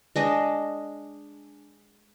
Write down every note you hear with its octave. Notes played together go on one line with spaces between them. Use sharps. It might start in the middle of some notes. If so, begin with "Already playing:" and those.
G#3 D4 D#5